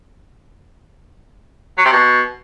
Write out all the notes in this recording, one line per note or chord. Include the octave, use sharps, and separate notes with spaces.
F#3
C3
B2